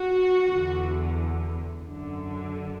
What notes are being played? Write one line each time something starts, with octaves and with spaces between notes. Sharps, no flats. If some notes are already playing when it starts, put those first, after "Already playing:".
Already playing: F#4
E2 D3
F#2 D3